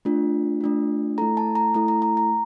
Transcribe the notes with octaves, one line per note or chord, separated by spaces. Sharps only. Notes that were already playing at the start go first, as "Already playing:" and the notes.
A3 D4 F4
A3 D4 F4
A3 E4 A4 A#5
A5
A#5
A3 E4 A4 A#5
A#5
A#5
A#5